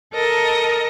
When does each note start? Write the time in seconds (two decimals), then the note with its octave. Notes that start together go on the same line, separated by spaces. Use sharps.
0.13 A4 A#4 D#5 A5